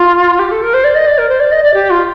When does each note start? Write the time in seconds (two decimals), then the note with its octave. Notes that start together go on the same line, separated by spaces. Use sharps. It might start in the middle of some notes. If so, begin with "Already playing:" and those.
Already playing: F4
0.39 G4
0.51 A4
0.63 A#4
0.74 C5
0.84 D5
0.95 D#5
1.07 D5
1.18 A#4
1.29 C5
1.40 D5
1.51 D#5
1.63 D5
1.74 G4
1.90 F4